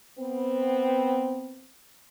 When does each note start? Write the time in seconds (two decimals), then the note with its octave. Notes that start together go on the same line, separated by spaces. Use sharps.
0.19 B3 C4